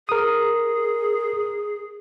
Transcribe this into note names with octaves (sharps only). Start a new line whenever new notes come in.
G#4 A#4 D#6